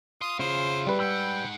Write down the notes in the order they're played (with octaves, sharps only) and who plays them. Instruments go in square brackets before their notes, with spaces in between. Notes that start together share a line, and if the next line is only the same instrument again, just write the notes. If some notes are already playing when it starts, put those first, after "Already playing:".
[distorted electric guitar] F5 C6 [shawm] D#6
[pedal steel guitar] C#3 F4 [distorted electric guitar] E4 G#4 [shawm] C5
[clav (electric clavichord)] G3 B4
[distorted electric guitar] G#2 F#5 [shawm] G5 [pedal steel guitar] B5 E6